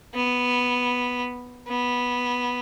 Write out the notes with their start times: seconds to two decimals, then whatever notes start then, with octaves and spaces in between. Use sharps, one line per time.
0.14 B3
1.68 B3